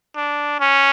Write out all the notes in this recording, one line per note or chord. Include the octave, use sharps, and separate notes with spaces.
D4
C#4